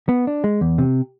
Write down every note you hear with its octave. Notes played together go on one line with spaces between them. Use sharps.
B3
D4
G#3
E2
C3